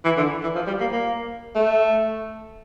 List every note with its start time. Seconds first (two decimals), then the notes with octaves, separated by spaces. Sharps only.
0.05 E3
0.17 D3
0.43 E3
0.55 F3
0.67 G3
0.80 A#3
0.91 A#3
1.55 A3